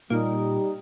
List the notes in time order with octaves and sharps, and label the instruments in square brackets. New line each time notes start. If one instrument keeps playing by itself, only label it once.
[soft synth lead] A#2 [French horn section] G3 [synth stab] A#3 [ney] D#4